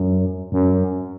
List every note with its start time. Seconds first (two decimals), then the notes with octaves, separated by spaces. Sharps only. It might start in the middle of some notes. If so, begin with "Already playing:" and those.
Already playing: F#2
0.52 F#2